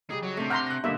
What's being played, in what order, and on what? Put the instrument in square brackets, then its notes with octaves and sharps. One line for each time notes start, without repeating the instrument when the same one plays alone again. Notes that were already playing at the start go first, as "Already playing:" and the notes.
[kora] C#3 G3 D#4 [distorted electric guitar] G#4
[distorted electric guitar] F#3
[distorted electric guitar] C3 [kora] A3 D4
[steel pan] F#5 A#5 C6 [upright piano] F6 G6 A#6
[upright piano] F#6 A#6
[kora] G2 D#4 [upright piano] A#2 D3 A#3 [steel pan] E5